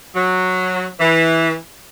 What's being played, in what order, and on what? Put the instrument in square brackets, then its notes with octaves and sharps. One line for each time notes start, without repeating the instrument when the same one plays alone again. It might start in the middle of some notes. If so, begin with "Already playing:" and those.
[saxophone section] F#3
E3